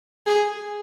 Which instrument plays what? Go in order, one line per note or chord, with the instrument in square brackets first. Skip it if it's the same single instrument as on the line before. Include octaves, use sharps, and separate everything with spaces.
[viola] G#4